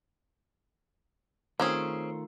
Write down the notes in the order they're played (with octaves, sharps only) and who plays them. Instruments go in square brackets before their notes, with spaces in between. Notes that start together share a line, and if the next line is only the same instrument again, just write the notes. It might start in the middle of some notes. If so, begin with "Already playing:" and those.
[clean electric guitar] D#3 A3 F4 [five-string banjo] C4 C#4 G#4